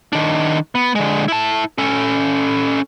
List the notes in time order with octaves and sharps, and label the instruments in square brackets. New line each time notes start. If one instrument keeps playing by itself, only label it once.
[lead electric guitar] D#3 D4
B3
D3 G#3
E4 A5
C#4 A4